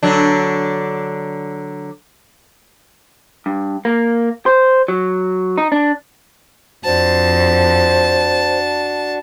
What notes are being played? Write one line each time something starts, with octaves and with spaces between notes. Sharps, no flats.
D3 F#3 D4
G2
A#3
C5
F#3
D#4
D4
F2 D4 F#4 C5 A5